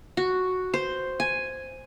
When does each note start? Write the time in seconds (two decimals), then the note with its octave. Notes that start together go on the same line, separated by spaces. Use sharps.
0.17 F#4
0.74 C5
1.20 G#5